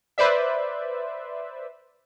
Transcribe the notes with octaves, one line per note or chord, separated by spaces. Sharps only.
B4 C5 D5 E5